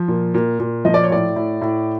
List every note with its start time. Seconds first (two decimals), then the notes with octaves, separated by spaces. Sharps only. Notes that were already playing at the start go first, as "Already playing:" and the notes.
Already playing: F3
0.08 A#2
0.34 A#2
0.59 A#2
0.85 F3 D#5
0.94 D5
1.04 C#5
1.10 A2 D5
1.36 A2
1.61 A2